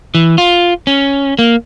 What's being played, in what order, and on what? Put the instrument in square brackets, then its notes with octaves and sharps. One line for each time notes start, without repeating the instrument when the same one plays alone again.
[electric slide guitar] E3
F4
C#4
A#3